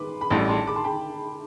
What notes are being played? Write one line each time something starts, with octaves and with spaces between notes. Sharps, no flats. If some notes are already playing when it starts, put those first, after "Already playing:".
Already playing: B4 B5 C6 D6
B5
A1 A2 G3 D4 A5 C6
A5 C6
B5 D6
A5 C6
G5 B5